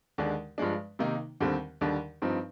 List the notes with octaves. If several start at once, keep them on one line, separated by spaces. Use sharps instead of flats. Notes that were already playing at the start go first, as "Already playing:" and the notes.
D#2 D3 G#3 D4
G2 F3 G#3 D4
C3 D#3 A#3 D#4
D#2 D3 G3 C4
D#2 D3 G3 D4
G2 F3 C4 D#4